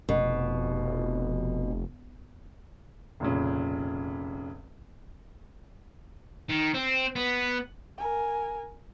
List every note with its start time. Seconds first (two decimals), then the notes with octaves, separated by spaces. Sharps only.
0.09 F1 B2
3.20 F1 A#2 C#3
6.49 D#3
6.74 C4
7.16 B3
7.98 A#4 G#5